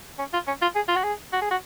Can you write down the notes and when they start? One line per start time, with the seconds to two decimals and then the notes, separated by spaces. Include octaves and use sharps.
0.19 C#4
0.33 F4
0.47 C#4
0.62 F4
0.75 G#4
0.88 F4
0.96 F#4
1.04 G#4
1.32 F#4
1.42 G#4
1.51 F#4